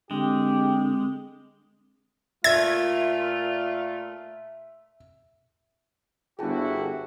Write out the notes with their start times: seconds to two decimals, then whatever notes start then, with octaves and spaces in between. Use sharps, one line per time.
0.11 D3 G#3 C4 G4
2.44 A#2 A3 F4 E5 G#6
6.39 G1 E4 F#4 G#4 G5 A5